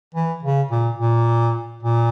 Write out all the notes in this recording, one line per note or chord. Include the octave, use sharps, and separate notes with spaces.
E3
C#3
A#2
A#2
A#2